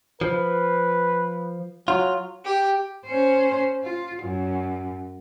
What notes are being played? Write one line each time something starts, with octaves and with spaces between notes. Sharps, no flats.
F3 B4
F#3 F4
G4
C#4 C5
F4
F#2